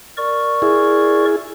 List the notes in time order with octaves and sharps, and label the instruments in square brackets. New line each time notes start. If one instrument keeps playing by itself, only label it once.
[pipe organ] A#4 D5 C#6
[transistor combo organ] E4 G#4